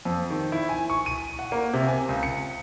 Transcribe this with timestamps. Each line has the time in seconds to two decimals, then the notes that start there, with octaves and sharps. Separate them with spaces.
0.05 F2
0.30 D#3
0.52 E4
0.69 G#5
0.90 C#6
1.06 D#7
1.39 F#5
1.52 A#3
1.74 C3
1.88 G#5
2.09 C#2
2.23 C#7